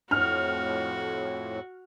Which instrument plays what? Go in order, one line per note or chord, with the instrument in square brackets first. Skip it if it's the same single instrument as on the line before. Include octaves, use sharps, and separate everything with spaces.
[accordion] F2 A2 [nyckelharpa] F#4 [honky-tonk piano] F6